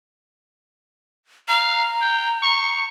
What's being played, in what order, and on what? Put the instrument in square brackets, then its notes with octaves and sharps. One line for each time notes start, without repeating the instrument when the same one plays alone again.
[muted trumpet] F5 [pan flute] A#5
[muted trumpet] G5
C#6